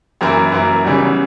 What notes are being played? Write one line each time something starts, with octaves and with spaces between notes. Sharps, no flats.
F#2 E3 A#3 E4 A#4
F#2 E3 A#3 E4 A#4
C#3 E3 G3 B3 F#4